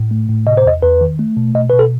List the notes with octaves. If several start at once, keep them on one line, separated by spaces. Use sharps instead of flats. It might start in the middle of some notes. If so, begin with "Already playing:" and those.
Already playing: A2
A3
A2
C3 D#5
C5
E2 D#5
E2 B4
D#3
A3
B2
B2 D#5
B2 B4
A4